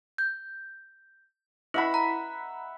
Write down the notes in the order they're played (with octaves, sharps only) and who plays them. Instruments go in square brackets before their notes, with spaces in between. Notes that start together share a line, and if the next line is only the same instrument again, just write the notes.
[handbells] G6
[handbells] E4 [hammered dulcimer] E5 F#5 B5
[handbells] A#5